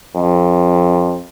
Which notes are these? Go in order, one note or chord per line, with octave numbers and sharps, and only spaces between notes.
F2